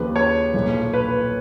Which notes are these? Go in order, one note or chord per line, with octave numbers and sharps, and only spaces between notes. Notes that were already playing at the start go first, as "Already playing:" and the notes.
Already playing: D#2 C#3 F3 B4
C#5
B1 A#2 F3
B4